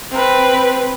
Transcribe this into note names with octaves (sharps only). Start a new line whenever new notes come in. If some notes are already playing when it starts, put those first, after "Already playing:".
C4 B4